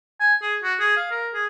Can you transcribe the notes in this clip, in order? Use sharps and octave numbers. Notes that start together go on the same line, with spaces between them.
G#5
G#4
F#4
G#4
F5
A#4
G#4